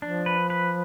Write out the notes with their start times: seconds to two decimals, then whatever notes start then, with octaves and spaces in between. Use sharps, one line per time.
0.02 F3 D4
0.26 B4
0.50 B4